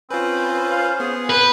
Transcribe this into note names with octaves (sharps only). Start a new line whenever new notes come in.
C4 C#4 F4 B4 C5
F5
B3 G#4
B4 G6